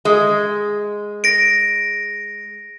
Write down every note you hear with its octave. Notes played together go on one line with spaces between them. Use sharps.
G#3
A#6 D7